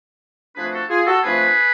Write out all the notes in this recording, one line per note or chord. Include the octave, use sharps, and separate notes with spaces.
F2 F3 A3 D4 G#4 B4
F#4 A4
F4 G#4
F#4 A4
F2 F3 A3 D4 G#4 B4